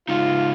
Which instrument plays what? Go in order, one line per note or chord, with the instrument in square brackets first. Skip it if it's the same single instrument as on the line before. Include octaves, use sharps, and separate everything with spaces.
[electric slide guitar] C#3 G#3 D#4 [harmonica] F4